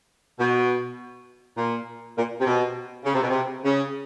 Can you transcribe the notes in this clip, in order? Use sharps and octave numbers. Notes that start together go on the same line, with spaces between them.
B2
A#2
A#2
C3
B2
C#3
C3
B2
C3
C#3